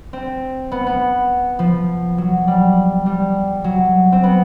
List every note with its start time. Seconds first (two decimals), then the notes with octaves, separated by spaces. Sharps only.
0.13 C4
0.71 B3
0.86 B3
1.59 F3
2.18 F#3
2.47 G3
3.06 G3
3.64 F#3
4.12 C4
4.23 B3